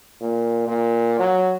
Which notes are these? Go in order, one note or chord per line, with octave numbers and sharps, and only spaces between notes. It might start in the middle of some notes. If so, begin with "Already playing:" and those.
A#2
A#2
F#3